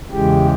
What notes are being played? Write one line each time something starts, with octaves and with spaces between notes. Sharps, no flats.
E2 C#3 E3 G#3 G4